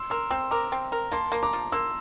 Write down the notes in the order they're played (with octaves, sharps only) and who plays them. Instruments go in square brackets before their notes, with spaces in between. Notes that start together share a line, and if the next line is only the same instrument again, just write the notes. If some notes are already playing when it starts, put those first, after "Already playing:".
Already playing: [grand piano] C6 E6
[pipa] A#4 [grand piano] C6 E6
[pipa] C4 [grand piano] C6 E6
[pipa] A#4 [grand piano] A#5 D6
[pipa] C4
A#4
[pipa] A#3 [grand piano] A5 C6
[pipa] A#3 [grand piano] C6
[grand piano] A#5 D6
[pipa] F3
[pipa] A#3 [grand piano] C6 E6